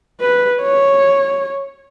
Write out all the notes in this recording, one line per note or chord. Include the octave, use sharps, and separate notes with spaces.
B4
C#5